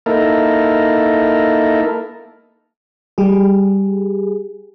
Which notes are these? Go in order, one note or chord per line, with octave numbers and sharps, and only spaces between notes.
A#3 D#4 E4 A4 A#4
G3 G4 G#4